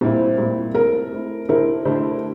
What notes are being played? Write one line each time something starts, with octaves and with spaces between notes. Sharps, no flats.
A#2 G3 C4 E4 C5
A#2 G3 C4 E4
A3 C4 E4 A#4
A3 C4 E4
D3 A3 E4 G4 A#4 C5
D3 A3 E4 G4 C5